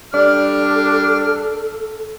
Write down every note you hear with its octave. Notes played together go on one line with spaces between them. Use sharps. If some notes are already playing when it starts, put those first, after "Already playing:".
G3 D4 A4 D5 F6